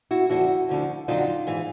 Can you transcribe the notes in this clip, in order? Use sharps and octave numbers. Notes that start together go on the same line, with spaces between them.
E4 F#4
F2 D3 F3 E4 F#4
D2 D3 F3
F2 D3 F#3 D#4 F4
G#2 E3